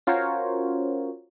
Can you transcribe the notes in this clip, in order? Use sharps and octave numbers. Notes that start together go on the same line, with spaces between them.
C#4 F4 F#4 A#4 C5 C#5